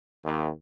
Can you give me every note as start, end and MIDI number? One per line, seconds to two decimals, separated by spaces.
0.23 0.50 39